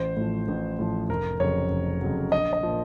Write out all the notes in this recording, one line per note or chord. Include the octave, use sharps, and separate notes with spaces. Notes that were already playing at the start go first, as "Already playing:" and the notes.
Already playing: A1 C5
A2 F3
A1
A2 F3
F1 A#4
F2 C#3 F#3 C#5
F1
F2 C#3 F#3
A#1 D#5
D#5
A#2 F3